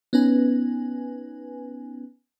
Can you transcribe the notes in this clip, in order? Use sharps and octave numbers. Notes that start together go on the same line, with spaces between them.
B3 C#4 D#4 B4 G#5